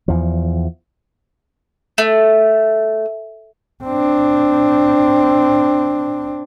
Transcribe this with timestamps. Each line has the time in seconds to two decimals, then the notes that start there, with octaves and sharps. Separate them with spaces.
0.08 E2 F3
1.98 A3
3.84 C4 D4